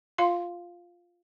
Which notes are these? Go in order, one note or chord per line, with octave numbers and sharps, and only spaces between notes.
F4 F5 C6